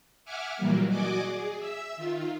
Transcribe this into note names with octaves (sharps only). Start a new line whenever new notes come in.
E5 F#5 G#5 D6 F6
A#2 D#3 E3 F#3 G3 A#3
F#4 D5 D#5 G#5 D6
G#4
E5 E6
D#3 F4